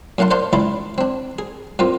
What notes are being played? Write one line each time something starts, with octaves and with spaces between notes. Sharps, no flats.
F#2 A2 F5 F#5 A5 C6
C5 D5 F5 F#5 A5 C6
C#2 D#4 E4 D5 C6 D6
C4 D4
G#4
G2 A#3 C4 F4